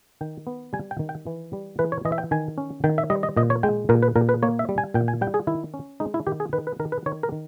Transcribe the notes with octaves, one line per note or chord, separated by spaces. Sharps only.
D#3 G5
B3
G3 G#5
G5
D#3
G5
E3
G3
E3 B4
C#5
E3 D#5
E5
G5
D#3 G#5
C#4
D#3 G5
E5
G3 D#5
D#5
A#2 D#5
C#5
G#3 G5
A#2 A#4
B4
A#2 A#4
B4
A#3 C#5
E5
G3
G#5
A#2 G5
G#5
G3 G5
G#4
D#3 E4
C#4
G#3 D#4
E4
D#3 G4
G#4
D#3 B4
B4
D#3 A#4
B4
D#3 C#5
A#4
D#3